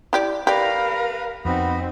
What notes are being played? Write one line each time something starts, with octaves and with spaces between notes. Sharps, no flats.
E4 G4 D5
G4 A#4 B4 D5 F5 B5
F2 B3 C4 D#4 F#4 B5